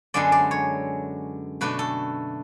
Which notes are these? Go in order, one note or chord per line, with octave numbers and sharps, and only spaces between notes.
F#2 D3 G#3 B3 D4 D5
D5
C#5
B2 A3 D4 B4
A4